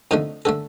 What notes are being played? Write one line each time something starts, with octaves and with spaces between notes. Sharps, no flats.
F2 D3 A3 D#4
D3 A3 A4